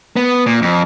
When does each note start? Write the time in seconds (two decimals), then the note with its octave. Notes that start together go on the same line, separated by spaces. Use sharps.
0.16 B3
0.46 A#2
0.62 F2